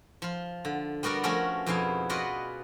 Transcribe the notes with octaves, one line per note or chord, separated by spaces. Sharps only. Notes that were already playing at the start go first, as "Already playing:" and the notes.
F3 F4
D3
G3 B3 F#4 A#4 D5
F3 A3 C#4 F#4 A#4
F2 B2 B3 E4 G#4 F5
F4 F#4 B4 D5 D#5 F#5